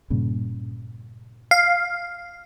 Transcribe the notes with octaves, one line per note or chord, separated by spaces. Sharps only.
G2 A#2 C#3
F5